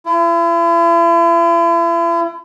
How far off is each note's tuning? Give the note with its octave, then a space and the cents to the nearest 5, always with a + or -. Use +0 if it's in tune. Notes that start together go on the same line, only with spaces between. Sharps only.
E4 +40